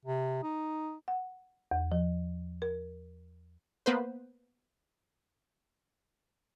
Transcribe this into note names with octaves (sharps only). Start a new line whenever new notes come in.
C3
D#4
F#5
E2
F3
A#4
A#3 B3 B4 C5